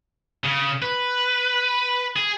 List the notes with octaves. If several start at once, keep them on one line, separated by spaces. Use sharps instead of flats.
C#3
B4
G#4